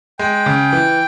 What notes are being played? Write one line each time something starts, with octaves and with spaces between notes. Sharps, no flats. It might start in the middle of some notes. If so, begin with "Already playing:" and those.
G#3 G5
C#3
E3